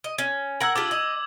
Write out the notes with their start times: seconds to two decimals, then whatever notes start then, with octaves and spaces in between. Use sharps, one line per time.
0.04 D#5
0.18 C#4
0.60 A#4 F#5 E6 G#6 F#7
0.76 D4 F4 G4 D6
0.91 D#5